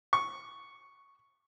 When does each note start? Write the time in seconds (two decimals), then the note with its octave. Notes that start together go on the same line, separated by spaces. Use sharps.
0.13 C#6